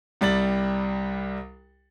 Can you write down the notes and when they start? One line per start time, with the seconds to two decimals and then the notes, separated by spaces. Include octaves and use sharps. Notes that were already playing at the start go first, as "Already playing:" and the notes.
0.21 C2 G3 A6 F#7